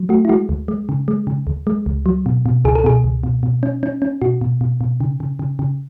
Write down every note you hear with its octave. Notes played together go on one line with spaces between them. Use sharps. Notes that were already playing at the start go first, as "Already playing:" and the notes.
Already playing: F#3
A3 F#4
E4
G#3 F#4
D2
G#3
C#3
G#3
C#3
D2
G#3
C#2
F#3
B2
B2
C#2 G#4
A4
B2 G#4
C#2
B2
B2
C#4
C#4
C#4
B2 F#4
B2
B2
B2
C#3
C#3
C#3
C#3